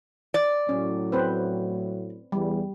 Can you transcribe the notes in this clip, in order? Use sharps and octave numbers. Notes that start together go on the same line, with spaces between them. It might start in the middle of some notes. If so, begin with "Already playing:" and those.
D5
A2 F#3 C#4
C4 B4 C5
E2 G3